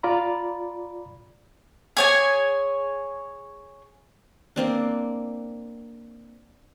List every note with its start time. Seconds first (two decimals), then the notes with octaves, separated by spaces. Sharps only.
0.03 F4 D5 A#5 B5
1.97 G#4 C#5 G#5
4.56 A#3 C4 D4